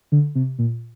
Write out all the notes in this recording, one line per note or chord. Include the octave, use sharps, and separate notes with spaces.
D3
C3
A#2